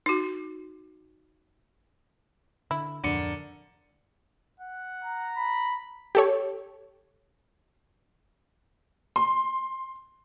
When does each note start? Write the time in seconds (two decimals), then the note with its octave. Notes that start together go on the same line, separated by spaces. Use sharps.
0.06 D#4 F#4
2.71 D3 E4
3.04 D1 F2 D3 D4 A#4 C#6
4.60 F#5
5.04 A#5
5.37 B5
6.15 G4 A4 C#5
9.16 C6